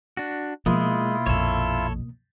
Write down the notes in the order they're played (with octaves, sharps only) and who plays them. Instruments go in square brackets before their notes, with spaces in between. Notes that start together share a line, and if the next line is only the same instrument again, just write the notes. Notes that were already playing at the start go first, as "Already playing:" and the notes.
[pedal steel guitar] D4 F#4
[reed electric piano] B2 A#3 D#6 [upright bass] F3 [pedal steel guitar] G#3 [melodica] E4 F4
[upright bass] A#1 F2 [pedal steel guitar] A4 C#5